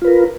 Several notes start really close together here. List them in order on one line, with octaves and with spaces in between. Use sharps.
F4 B4 A#4